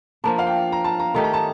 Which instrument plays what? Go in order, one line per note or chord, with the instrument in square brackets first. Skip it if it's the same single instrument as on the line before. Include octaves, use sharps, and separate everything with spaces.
[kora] F3 A#3 D4 [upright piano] A5
[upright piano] F5
G5
A#5
A5
A#5
[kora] D#3 A3 D#4 G4 [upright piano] A5
[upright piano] A#5
A5